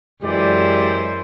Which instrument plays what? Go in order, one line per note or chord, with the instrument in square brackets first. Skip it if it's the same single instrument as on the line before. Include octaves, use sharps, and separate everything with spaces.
[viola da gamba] F#2 E3 C5 [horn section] G#3 G4 D5